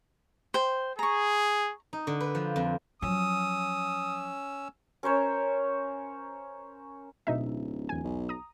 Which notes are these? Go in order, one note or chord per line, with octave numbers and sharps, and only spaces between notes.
C5 G5
G#4 A#5 C#6
D#4
D3
B4
F3
F2
F3 F#3 C#4 D#6 E6
C#4 A#4 C5 C#5
D1 B2 D#4 E5
E2 G#5
B1
A#5 D#6